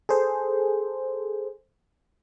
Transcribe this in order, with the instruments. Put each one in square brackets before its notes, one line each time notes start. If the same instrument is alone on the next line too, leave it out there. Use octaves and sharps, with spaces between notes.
[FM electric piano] G#4 A4 C5